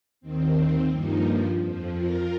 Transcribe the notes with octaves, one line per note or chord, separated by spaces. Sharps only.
D#2 D#3 C4
G2 F3 A#3 D#4
F2 F3
F4 A#4